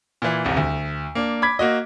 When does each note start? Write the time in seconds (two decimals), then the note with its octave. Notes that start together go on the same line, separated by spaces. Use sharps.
0.22 A#2 E3
0.45 D#1 C2 F2
0.57 D2
1.15 A#3 D4
1.42 B5 D6 G#6 B6
1.59 A#3 F#4 D#5